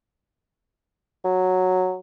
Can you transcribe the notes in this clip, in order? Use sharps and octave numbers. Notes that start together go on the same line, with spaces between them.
F#3